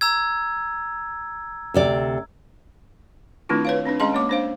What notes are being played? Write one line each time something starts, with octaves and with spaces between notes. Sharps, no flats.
A#5 E6 G#6
D2 C3 D5
D#3 A3 C4 D4 E4 F4
B4 C#5 F5
C4 D4 D#4 B4
G#3 C#4 G#4 D#5 A5 C6
A#3 C#5 D6
D4 C5 F5